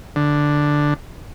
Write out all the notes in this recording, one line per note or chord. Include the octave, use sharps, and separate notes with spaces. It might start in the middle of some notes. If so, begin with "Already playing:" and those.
D3